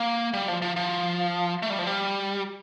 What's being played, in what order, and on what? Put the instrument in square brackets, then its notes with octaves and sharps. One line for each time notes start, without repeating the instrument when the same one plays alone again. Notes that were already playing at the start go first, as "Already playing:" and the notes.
Already playing: [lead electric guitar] A#3
G3
F3
F3
F3
A3
G3
F3
G3